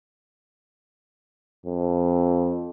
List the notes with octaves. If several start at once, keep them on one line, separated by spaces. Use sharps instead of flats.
F2